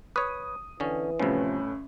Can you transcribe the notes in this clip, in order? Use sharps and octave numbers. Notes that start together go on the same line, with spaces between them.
B4 C#5 D#6
D3 E3 C#4
G1 A2 C3 F3 A3 C#4